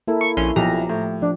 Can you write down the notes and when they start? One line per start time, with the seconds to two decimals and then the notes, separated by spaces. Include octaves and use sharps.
0.07 A#3 E4 A4 A#4
0.21 C#6
0.37 A#1 C#4 C6
0.56 B1 F3 G4 A#5
0.89 A2
1.22 F3 D4